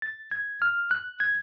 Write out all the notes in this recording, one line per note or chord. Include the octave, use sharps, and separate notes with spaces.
A6
G#6
F6
F#6
G#6